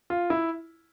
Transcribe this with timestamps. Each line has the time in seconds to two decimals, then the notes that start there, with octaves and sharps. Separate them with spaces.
0.10 F4
0.30 E4